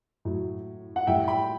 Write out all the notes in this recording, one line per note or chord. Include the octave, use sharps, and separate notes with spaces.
A2 F#3
F#5
A2 G3 E5 G5
G5 B5